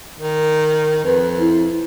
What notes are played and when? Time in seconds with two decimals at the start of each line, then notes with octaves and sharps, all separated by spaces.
0.19 D#3
1.04 F2 B4
1.39 E4